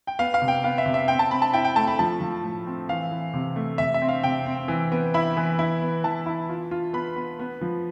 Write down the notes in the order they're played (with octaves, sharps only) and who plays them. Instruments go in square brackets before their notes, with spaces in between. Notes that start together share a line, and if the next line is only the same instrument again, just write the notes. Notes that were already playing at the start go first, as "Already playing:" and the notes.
[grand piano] G5
B3 F5
F5
C3
G5
B3 F5
E5
C3
E5
C4 G5
A5
C4 B5
A5
E4 G5
G5
A3 A5
B5
F3 A5
F3
A2
C4
E3 F5
E3
C3
A3
C3 E5
E5
C4
F5
C3 G5
C4
E3
B3
E4 B5
E3
E4
B3
E3 A5
E4
F4
F4
B3 B5
B3
B3
F3